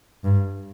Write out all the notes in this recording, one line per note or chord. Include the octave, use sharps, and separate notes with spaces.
G2